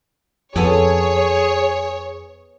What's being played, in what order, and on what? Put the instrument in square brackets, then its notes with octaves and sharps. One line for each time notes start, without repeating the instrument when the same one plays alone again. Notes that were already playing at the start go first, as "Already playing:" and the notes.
[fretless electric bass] F2 [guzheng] B3 A4 G#5 [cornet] G#4 [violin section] C#5